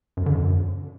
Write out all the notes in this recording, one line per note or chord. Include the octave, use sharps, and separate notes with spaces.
F#2
D3
F#2